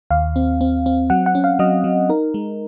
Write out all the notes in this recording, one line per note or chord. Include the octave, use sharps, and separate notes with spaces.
D#2 F5
C4
C4
C4
F#3 F#5
F#5
C#4
F5
F#3 D#5
F#3
D#4 A#4
G#3